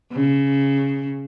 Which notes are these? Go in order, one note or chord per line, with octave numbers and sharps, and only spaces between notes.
C#3